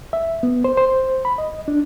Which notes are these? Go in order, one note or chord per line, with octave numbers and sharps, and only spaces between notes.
E5
B3
C5
C5
B5
D#5
D4